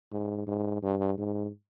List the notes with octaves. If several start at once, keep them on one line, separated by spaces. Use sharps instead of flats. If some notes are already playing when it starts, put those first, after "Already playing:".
G#2
G#2
G2
G#2